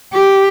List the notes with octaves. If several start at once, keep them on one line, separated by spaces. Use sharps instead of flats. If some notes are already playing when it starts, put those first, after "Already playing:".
G4